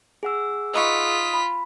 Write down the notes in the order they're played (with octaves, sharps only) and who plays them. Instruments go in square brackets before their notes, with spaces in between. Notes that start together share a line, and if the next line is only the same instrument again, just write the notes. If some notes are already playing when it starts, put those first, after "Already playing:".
[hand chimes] G#4 F#5 E6
[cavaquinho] D#4 B4 C#6 [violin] F4 B6 [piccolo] D#6
[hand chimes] B5